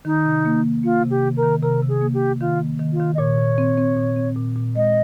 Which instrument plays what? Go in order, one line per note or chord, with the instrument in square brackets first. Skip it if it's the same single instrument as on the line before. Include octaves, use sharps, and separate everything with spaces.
[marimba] D#3 [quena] D#4
[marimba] C3
A#3
A#3
[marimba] A#3 [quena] F4
[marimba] C3
[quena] G4
[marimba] D#3
[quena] A#4
[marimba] D#3
[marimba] C3 [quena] A#4
[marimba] C3
[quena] G#4
[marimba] A#3
[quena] G4
[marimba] C3
[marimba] D#3 [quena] F4
[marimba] A#3
D#3
[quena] F4
[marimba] D#3
[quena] D#5
[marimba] A#2 [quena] C#5
[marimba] A#2
C4
C4
A#2
C4
A#2
A#2
[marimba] G#3 [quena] D#5